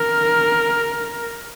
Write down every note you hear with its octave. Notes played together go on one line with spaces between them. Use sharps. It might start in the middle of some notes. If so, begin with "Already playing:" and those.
Already playing: A#4